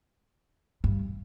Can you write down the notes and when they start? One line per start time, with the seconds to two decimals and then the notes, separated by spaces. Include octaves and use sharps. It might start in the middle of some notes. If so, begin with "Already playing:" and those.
0.84 G2